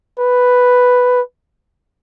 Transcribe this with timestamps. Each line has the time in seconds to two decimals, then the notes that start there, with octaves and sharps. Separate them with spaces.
0.20 B4